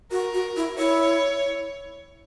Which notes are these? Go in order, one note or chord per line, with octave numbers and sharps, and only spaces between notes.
F#4 A#4
F#4
E4
E4 C#5